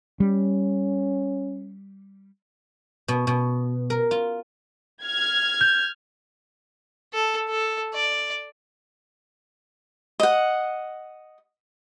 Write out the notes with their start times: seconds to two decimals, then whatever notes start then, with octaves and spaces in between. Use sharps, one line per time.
0.20 G3 C#4
3.08 B2
3.27 B2
3.90 A#4
4.11 F4
5.04 F6 G#6
5.61 G6
7.13 A4
7.49 A4
7.94 D5
10.20 D#5 F#5